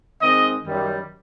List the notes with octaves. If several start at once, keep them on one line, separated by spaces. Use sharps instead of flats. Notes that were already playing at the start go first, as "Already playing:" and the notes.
D#3 G#3 C4 D#5
F#2 D#3 G3